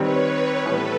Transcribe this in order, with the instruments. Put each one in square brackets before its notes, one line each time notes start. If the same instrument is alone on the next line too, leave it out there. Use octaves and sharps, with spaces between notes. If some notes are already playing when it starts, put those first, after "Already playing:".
Already playing: [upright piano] D#3 G3 C4 [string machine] B4 C#5
[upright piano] A2 E3 G3 B3 [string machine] A4 B4